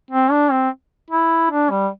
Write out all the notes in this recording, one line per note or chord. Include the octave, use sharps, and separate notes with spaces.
C4
D4
C4
E4
D4
G3